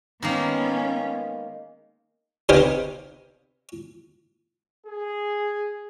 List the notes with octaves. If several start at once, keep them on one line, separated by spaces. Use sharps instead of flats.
D#3 G#3 A#3 B3 C#4
C3 B3 D#4 G4 C5 F5
G#4